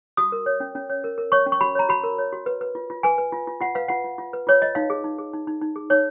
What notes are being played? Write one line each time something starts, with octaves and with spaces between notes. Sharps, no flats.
F#4 D#6
A#4
C#5
C#4
C#4
C#5
A#4
A#4
C#5 C#6
C#4
C#6
F#4 B5
C#5 A#5
F#4 B5
A#4
C#5
F#4
B4
B4
F4
F4
B4 G#5
B4
F4
F4
F4 F#5
B4 F5
F4 F#5
F4
F4
B4
F4 C#5
F4 D#5
D#4 F5
G#4
D#4
G#4
D#4
D#4
D#4
G#4
D#4 C#5